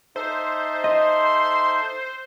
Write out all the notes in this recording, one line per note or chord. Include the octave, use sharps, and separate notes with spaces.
D#4 A4 C5 E5
D#5 C6